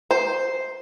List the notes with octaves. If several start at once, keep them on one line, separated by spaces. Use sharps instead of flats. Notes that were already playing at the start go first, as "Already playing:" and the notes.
C5